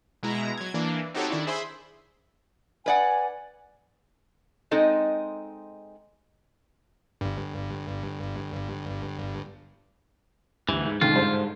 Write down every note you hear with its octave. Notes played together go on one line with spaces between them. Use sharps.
B2 G#3 E4 A#5
F#3 G#6
E3 A#3 D4
C4 D#4 F#4 G4 A4 C#5
D#3 D4 E4
G#4 C5 E5 B5 C6
B4 D5 F#5 G#5
G#3 C4 D#4 A4 D#5
G1 G2
D2 G2 E3
G#2
G#2 B2 D3 D#3 F4
G2 D3 C5